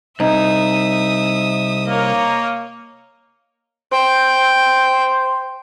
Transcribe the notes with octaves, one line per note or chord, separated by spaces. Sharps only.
C2 D#4 E5 D#6
A#3 C#5 D#5
C5 G5